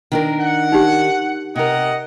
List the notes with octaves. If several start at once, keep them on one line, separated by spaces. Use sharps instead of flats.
D#3 D4 A#4
F#5
D#4 G4
C3 A#4 D#5 F#5